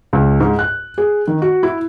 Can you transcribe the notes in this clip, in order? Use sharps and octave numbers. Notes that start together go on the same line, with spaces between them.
C#2
G#2
F#6
G#4
D#3
F#4
E4